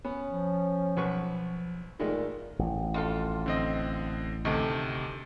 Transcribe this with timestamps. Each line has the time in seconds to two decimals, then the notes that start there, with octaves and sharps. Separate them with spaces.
0.05 B3 C#4
0.30 F3
0.97 B1 B4 C#6
2.00 A#2 D#3 G#3 A3
2.59 A1
2.94 F2 F4 A4
3.46 D3 C4 D#5
4.45 D2 C3 D#3 G4 A4